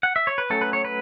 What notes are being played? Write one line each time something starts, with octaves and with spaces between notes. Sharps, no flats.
F#5
E5
C#5
B4
F#3 A3 C#4 A4
B4
C#5
B4